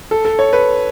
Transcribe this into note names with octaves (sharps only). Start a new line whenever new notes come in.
A4
A4
C#5
B4